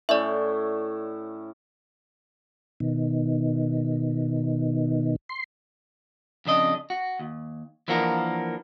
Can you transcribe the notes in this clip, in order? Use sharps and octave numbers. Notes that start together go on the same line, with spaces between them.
A2 C#4 E4 D5 E5
B2 D#3
C6
F2 C#3 D4 D#5
F#4
D#2
E3 F3 A#3 D4 F#4 A#4